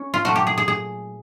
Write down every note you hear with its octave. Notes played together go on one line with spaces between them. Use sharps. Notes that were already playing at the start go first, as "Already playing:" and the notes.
Already playing: C#4
F4
A#2 F#3 A3 F#4
G4
G#4
G#4
G#4